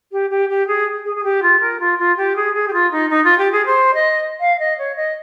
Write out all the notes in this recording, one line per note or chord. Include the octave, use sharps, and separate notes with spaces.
G4
G4
G4
G#4
G#4
G#4
G4
F4
A#4
F4
F4
G4
G#4
G#4
G4
F4
D#4
D#4
F4
G4
G#4
C5
D#5
F5
D#5
C#5
D#5